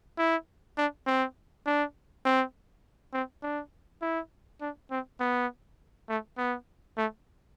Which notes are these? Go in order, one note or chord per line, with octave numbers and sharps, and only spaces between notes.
E4
D4
C4
D4
C4
C4
D4
E4
D4
C4
B3
A3
B3
A3